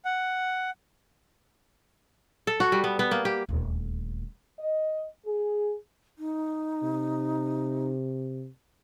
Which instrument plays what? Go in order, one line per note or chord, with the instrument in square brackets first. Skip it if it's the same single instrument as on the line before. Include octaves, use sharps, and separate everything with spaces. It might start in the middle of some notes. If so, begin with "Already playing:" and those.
[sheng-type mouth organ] F#5
[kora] A4
F#4
G3
B3
B3
A#3
G4
[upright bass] D#1 D2
[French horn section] D#5
G#4
[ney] D#4
[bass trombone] C3